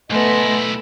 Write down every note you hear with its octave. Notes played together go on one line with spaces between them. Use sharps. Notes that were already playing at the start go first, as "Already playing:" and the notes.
B1 A3 B3 E4 D#5 G#5 C6